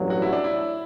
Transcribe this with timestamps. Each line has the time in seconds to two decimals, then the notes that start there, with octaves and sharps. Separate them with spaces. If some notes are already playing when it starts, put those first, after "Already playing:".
Already playing: A1 G2 F#3
0.10 F#4
0.22 E4
0.33 D4
0.44 E4